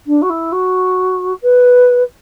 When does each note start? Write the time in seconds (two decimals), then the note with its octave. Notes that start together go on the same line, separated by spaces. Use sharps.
0.07 D4
0.22 F#4
0.30 E4
0.52 F#4
1.42 B4